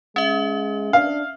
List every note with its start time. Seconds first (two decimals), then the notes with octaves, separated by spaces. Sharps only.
0.16 G#3 C#4 E5
0.93 D4 F5